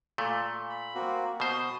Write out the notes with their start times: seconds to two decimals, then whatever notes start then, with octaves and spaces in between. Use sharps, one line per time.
0.18 A#2 A3
0.70 B5
0.94 A#3 C4 F#4
1.40 B2 C5 D#6